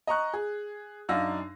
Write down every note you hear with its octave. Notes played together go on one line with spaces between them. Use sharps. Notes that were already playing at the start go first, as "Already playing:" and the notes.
D#5 A#5 C#6 F#6
G#4
F#2 D4 D#4 F5 E6 A#6